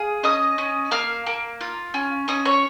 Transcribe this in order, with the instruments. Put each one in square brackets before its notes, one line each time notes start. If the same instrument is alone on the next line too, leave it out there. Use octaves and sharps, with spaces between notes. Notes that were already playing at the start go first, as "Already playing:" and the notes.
Already playing: [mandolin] G#4 F5
C#4 D#5 D#6
C#4
A#3 F5 F6
A#3
F4
C#4
C#4 D#5 D#6
C#5 C#6